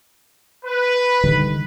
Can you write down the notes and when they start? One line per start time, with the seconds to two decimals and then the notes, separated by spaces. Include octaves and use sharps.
0.65 B4
1.24 D3 D#3 G3